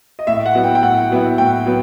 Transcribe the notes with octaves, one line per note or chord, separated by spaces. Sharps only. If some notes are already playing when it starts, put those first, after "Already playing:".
D#5
A2 E5
F#5
F#3 B3 E4
G5
G5
A2 F#5
F#3 B3 E4
A2 G5
F#3 B3